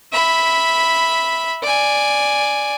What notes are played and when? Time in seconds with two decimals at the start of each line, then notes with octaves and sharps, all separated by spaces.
0.13 E5 B5
1.63 D5 G#5